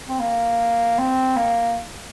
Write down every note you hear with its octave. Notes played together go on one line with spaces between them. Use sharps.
C4
A#3
C4
A#3